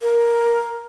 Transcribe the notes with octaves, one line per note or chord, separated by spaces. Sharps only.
A#4